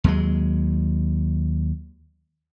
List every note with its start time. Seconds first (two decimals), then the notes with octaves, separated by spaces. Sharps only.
0.04 D#2 F#3 G#3